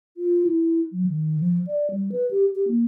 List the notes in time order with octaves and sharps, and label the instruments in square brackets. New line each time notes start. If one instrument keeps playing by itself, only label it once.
[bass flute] F4
E4
F#3
D#3
F3
D5
G3
B4
G4
G4
A#3